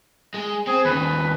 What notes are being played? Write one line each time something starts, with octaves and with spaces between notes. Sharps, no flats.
G#3
C4 G#4
D#2 C#3 B4